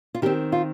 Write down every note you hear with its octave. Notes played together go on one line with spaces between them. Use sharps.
F4
D#3 C4 G4
F4